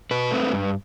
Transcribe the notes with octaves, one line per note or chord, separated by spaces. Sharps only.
B2 B4
A3 C4
G2